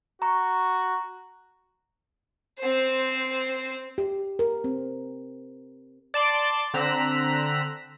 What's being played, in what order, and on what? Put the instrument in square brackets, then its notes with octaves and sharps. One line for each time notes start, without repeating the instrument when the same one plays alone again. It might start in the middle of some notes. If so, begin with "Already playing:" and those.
[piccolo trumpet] F#4 [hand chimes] A#5 C#6
[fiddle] C4 C5
[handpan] G4
A#4
C4
[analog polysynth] D5 A5 C6 D6
D3 C4 A#5 E6 F#6 B6